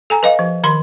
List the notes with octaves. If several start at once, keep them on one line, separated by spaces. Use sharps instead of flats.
A4 G#5 A#5
B4 D#5 F5
F3
D#3 B5 C6